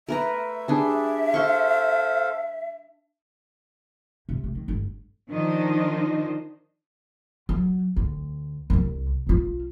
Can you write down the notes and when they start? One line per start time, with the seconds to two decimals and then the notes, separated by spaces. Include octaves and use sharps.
0.09 A3 A#4 B4 E5 A#5
0.68 G3 D4 G#4
1.34 A4 C5 F5 C6 C#6
4.29 C3
4.43 A3
4.55 D#3
4.68 G1
5.30 D#3 F3 D4 D#4 C5 D#5
7.49 F#3
7.96 D2
8.70 D1 C2
9.27 B1 F4